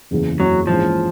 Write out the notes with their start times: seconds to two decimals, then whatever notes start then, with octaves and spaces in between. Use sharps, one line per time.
0.11 F#1 E2 C#3 E3
0.39 F#1 E2 C#3 E3 F#3
0.67 A#1 G#2 E3 F3 G#3 C#4